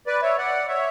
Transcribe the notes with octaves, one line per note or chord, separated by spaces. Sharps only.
B4 D5
C#5 E5
D5 F#5
C#5 E5